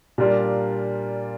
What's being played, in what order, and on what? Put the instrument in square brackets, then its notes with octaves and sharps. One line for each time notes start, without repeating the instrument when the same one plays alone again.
[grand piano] A#2 G3 D4 F4 A#4